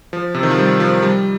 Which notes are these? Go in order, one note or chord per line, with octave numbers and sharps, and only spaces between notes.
F3
C3
D#3
F3
G3
F3
G3